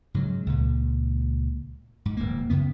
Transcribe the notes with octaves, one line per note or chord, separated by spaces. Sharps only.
G#2 C#3 F#3
C#2 A#2
G#2
D1 E2 A#3
F#2 C#3 B3